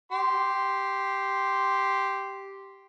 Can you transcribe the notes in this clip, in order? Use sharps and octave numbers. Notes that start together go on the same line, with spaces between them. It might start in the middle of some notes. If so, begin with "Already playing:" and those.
G4 C6